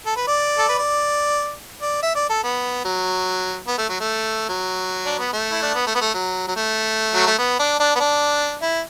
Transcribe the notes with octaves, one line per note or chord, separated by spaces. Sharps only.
A4
B4
D5
A4
B4
D5
D5
E5
D5
A4
B3
F#3
B3
A3
F#3
A3
F#3
D4
B3
A3
E4
D4
B3
A3
B3
A3
F#3
F#3
A3
F#3
A3
B3
D4
D4
B3
D4
E4